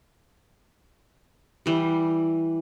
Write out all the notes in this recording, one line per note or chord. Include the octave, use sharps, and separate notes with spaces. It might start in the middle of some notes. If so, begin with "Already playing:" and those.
E3 G3